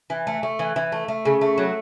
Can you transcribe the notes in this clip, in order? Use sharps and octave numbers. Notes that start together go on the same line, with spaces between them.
E3
A3
A3
E3
E3
A3
A3
C#3
A3
F#3